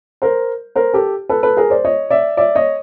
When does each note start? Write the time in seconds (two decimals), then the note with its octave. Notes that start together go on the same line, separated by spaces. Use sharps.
0.22 A#4 C5
0.75 A#4 C5
0.93 G4 A4
1.29 A4 B4
1.43 A4 B4
1.57 G#4 A#4
1.70 C5 D5
1.85 C#5 D#5
2.10 D5 E5
2.37 D5 E5
2.55 C#5 D#5